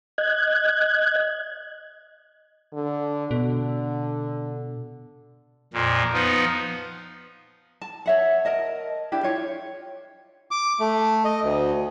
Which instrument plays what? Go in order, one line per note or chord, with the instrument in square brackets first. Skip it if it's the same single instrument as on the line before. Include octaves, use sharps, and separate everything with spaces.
[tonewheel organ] D#5 F#6 G#6
[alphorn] D3
[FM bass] B2 [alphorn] D3
[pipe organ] F2 A#2
F3 B3 D#4
[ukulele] A5
C#5 E5 F#5
A#4 D#5 A5
D4 E4 G4
F4 C#5
[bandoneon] D6
A3
D#5
D2